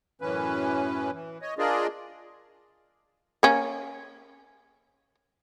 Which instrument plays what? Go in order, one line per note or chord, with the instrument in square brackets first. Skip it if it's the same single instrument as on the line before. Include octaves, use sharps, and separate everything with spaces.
[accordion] F#2 A2 E3 C#4 B4
E3
C#5 D#5
D4 F4 G#4 A#4 D5 D#5
[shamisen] A#3 C#4